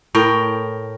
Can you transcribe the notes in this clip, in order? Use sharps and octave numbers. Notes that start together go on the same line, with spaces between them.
A2 A#4 G5